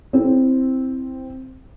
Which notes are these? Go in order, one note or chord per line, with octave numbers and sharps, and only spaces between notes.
C4 E4